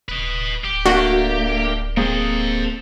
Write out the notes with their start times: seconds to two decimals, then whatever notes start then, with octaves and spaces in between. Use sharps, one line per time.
0.09 D1 B4 D#5
0.64 D1 G4
0.86 A3 A#3 D4 F#4
1.97 A#3 C4 G#4 A4 D#5